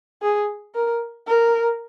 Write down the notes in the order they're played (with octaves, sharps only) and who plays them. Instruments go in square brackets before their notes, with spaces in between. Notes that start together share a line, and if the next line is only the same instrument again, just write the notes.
[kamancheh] G#4
A#4
A#4